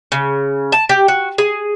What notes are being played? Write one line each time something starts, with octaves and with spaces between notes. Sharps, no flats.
C#3
A5
G4
F#4
G#4